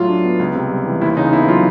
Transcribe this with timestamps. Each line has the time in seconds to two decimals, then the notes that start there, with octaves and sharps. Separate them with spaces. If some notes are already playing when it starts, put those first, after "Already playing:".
Already playing: A2 F#3 F4
0.08 D4
0.24 B3
0.39 C#2
0.55 C3
0.70 G3
0.86 E3
1.01 D#2 E4
1.17 C#3 D#4
1.33 B3 E4
1.48 F#3 F4